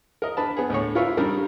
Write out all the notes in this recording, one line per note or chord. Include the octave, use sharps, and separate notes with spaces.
A#4 D#5
D4 B4 A5
B3 G#4
D2 A2 C#5
E4 F4 A#4 B4 C#5 E5
C#3 G3 D4 D#4 A#4